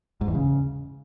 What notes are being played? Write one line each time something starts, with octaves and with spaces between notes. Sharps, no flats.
G#2
E2
C#3